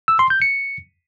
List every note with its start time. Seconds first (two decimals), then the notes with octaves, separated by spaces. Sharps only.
0.08 E6
0.19 C6
0.30 G6
0.42 C#7